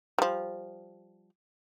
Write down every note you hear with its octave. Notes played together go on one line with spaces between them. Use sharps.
F3 G3